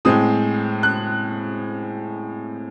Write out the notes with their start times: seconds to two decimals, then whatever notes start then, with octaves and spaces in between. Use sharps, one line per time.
0.05 A2 G#3 C4 D#6
0.83 F#6